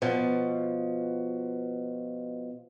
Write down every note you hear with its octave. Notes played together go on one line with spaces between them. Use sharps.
B2 F3